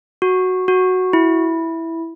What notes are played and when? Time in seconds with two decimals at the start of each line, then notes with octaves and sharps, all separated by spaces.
0.22 F#4
0.68 F#4
1.13 E4